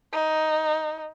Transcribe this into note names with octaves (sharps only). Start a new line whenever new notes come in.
D#4